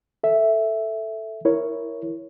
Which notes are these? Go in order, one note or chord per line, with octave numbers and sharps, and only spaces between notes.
A4 E5
E4 A#4 C#5